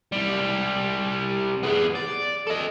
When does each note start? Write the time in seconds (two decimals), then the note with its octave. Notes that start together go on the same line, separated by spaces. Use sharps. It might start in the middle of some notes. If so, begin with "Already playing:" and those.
0.12 C2 G3
1.63 B3 G#4
1.95 D5
2.47 A4 D#5